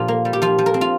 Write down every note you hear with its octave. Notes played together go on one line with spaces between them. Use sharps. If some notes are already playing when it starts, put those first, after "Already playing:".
Already playing: A#2 F3 F4 G4
A#3
G3
G4
F3 F4
F3
A#4
C4
F4